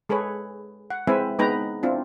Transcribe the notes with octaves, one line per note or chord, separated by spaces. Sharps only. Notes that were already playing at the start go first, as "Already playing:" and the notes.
G#3 G#4 A4 B4 C#5
F#5
G#3 C4 E4 B4 E5 G#5
G#3 B3 D#4 B4 G5 A#5
C4 D4 E4 F4